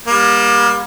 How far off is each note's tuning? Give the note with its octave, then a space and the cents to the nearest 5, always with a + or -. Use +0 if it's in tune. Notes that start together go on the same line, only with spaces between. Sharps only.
G3 +25 A#3 +35